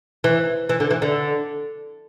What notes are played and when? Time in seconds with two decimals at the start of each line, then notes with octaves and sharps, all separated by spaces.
0.24 E3
0.69 E3
0.80 D3
0.90 E3
1.02 D3